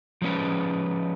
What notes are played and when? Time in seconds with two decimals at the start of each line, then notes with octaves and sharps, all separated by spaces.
0.22 F3 G#3 C#4 B4